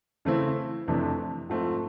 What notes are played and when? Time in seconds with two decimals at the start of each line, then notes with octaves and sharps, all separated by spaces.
0.25 C#3 E3 A3 C4 E4
0.88 F2 C3 E3 A3 D4
1.49 G#2 F3 A3 C4